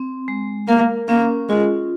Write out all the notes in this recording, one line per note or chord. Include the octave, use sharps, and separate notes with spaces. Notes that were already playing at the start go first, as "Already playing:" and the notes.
Already playing: C4
G#3
A#3 A#4
A#3 C#4
G#3 F4